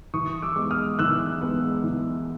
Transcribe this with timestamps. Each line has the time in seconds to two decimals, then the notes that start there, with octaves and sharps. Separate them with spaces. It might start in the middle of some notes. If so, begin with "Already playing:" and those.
0.14 E3 C#6 D#6
0.42 D6 E6
0.56 G#3 B3
0.71 D#6 F6
0.99 E3 E6 F#6
1.41 G#3 B3
1.84 E3